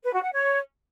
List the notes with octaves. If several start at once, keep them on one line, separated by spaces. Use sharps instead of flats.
B4
F#4
F#5
C#5